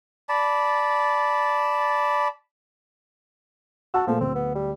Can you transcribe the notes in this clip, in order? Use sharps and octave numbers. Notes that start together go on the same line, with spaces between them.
D5 A5 B5
F#4 F#5 A5 E6
A#2 F3 A3
D1 C4
B3
G3